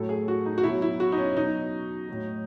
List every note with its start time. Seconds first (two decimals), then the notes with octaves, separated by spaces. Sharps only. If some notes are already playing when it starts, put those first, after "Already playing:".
Already playing: A2 F#3 A4
0.09 G#4
0.28 F#4
0.46 D#4
0.58 F#4
0.63 B2 F#3 E4
0.82 E4
1.00 F#4
1.12 D#4
1.17 C#4
1.36 B2 F#3 D#4
2.09 A2 F#3